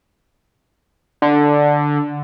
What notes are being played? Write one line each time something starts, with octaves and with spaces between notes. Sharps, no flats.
D3